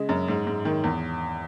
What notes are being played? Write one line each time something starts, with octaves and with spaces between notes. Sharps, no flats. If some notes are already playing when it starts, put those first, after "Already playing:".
Already playing: C#3 G#3
F#2
G#2
G#2
D#3
E2